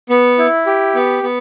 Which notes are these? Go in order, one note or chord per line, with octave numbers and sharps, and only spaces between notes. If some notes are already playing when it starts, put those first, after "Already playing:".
B3
E4
G4
B3
B3